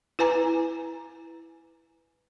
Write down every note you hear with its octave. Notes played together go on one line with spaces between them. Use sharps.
E4 B4 G#5 A#5